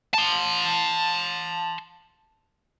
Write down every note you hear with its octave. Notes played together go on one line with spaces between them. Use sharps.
A5 C6